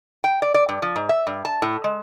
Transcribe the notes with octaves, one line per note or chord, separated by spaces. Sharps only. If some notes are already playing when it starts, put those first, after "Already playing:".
G5
D5
D5
G2
F3
G#2
E5
G2
A5
A2
G#3